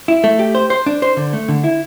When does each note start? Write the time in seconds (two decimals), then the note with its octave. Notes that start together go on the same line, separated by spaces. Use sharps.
0.08 E4
0.24 A3
0.39 G4
0.55 C5
0.70 C5
0.86 D4
1.02 C5
1.17 D3
1.33 A3
1.49 D3
1.64 E4